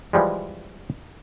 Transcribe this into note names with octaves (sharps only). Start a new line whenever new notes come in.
E3 F3 G3 G#3